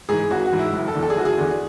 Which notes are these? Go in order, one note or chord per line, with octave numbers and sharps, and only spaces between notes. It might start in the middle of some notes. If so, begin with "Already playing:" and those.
G#2 E3 G#4
G#1 F#4
F#4
G#2 E3
E4
F#1
A4
E2 D3
A4
G#4
F#1 F#4
G#4
E2 D3